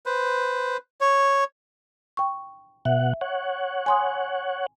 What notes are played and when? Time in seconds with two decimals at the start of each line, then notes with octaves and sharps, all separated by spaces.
0.06 B4 C5
1.01 C#5
2.17 G5 C#6
2.85 B2 E5 F#5
3.21 C#5 F#5
3.86 G#5 C6 D#6